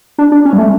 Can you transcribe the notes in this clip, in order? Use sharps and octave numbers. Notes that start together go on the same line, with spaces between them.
D4
D4
C#4
G3
A3